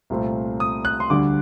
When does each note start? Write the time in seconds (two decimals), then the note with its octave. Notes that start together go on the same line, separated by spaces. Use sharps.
0.10 C2 A#2 A3 C4
0.60 D#6
0.85 F#6
1.00 C6
1.10 D2 D3 G3 D6